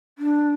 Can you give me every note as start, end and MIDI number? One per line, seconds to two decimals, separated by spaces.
0.19 0.53 62